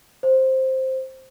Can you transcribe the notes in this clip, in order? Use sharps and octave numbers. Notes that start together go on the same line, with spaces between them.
C5